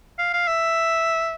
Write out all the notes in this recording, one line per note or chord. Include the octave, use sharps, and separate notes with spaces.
F5
F5
E5